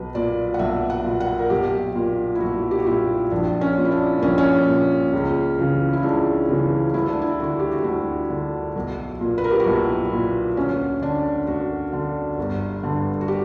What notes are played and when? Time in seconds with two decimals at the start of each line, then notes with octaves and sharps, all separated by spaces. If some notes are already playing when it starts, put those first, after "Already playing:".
Already playing: B1 B4
0.15 A#2 D5
0.54 F#5
0.59 B1 E5
0.90 F#5
1.05 A#2
1.20 F#5
1.39 A#4
1.50 B1 G4
1.95 A#2
2.35 E4
2.40 B1 F#4
2.71 G4
2.78 F#4
2.86 A#2 E4
3.31 A#1 D4
3.61 C#4
3.77 A#2
3.85 E4
3.92 D4
4.22 A#1 C#4
4.38 C#4
4.68 A#2
5.13 C#2
5.59 C#3 E3
5.93 E4
6.03 C#2 D4
6.49 C#3 E3
6.94 D2 E4
7.08 D4
7.22 E4
7.39 D3 F#4
7.59 G4
7.72 F#4
7.84 D2 E4
8.30 D3
8.76 B1
9.21 A#2
9.38 B4
9.44 A#4
9.51 G4
9.60 F#4
9.65 B1 E4
10.12 A#2
10.57 D2 C#4
11.02 D3 D4
11.47 D2 F#4
11.93 D3
12.38 G1
12.83 G2 D3
13.21 F#4
13.28 G4